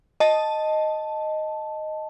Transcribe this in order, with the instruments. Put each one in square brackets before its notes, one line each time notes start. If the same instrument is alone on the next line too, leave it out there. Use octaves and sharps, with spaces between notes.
[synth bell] D#5 A5